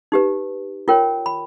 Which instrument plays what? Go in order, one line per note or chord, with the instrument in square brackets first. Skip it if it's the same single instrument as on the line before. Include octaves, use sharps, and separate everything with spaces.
[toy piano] D#4 G4 B4
F4 A#4 C#5 G5
B5